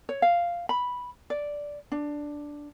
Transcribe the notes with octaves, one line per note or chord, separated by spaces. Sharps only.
C#5
F5
B5
D5
D4